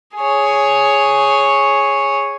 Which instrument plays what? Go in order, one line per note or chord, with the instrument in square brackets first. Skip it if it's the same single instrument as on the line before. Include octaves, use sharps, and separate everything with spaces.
[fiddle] G#4 C#5